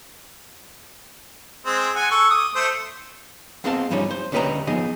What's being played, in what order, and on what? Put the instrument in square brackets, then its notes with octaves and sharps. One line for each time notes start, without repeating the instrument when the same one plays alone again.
[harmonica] G#3 C4
F#5 G#5
A4 C#6
D6 D#6
A3 C5
[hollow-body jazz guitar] B3 C4 G#4 D#5 F5 A5
G2 F3 G3 C#4 D#4
C5
D2 C#4 G4 B4 D#5 A#5
F3 B3 D#4 G#4 D#5